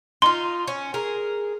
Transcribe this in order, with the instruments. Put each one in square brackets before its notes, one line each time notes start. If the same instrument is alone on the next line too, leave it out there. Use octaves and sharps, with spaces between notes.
[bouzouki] D#4 F4 [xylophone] C6
[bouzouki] C#4
G#4 A#4